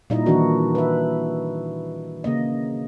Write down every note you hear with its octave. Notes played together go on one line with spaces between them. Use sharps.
A#2 G3 D#4 E4 D#5
D#3 E3 D4 E4 F#4 A#4
B4 E5
C#3 A#3 D#5